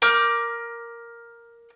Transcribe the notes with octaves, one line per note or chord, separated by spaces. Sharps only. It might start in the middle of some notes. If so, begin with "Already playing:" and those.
A#4 D6 F6 G6